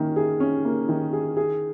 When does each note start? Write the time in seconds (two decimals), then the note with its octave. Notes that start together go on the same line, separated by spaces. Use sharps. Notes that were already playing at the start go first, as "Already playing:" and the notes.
Already playing: D#3 A#3 C#4
0.16 G#4
0.40 C#4
0.65 A#3
0.89 D#3
1.13 G#4
1.37 G#4